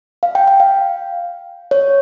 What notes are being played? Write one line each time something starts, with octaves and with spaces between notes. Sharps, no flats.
F5
G5
G5
F5
C#5